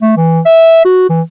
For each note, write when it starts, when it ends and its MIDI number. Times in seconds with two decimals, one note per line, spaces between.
0.02 0.16 57
0.17 0.40 52
0.46 0.84 76
0.85 1.09 66
1.10 1.22 52